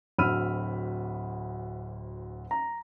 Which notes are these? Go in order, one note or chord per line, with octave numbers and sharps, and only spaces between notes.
D1 D2 B5 E6 F6 D#7
A#5